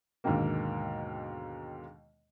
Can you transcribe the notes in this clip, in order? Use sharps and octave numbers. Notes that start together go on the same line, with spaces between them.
D#2 G#2 B2 D3 D#3 A#3